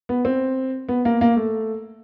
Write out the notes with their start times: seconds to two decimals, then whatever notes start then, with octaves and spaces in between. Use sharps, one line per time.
0.09 B3
0.25 C4
0.89 B3
1.05 A#3
1.21 A#3
1.36 A3